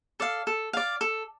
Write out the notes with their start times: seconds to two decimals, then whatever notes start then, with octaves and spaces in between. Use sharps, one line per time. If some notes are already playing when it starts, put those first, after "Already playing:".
0.20 A4 D5 F5
0.47 A4
0.73 D5 F5
1.01 A4